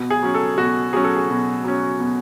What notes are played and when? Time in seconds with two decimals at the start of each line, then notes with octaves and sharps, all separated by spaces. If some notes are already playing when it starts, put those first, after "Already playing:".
Already playing: B2
0.10 G#4
0.23 F#3 C#4
0.34 A4
0.58 B2 F#4
0.93 F#3 C#4 G#4
1.04 A4
1.16 G#4
1.30 B2
1.64 F#3 C#4
2.00 B2